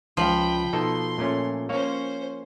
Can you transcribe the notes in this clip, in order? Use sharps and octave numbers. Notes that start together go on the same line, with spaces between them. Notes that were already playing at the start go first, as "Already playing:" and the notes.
C#2 F3 G5 B5
B2 D#4 A4 C6
A#2 A3 C#4
A#3 C#4 C5 C#5 F5